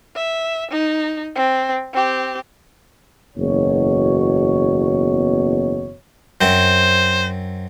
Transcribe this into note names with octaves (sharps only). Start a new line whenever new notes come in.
E5
D#4
C4
C4 G4
F#1 E2 B2 C#5
F#2 C4 C5